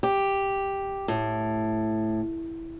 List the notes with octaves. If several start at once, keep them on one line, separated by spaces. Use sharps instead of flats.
G4
A2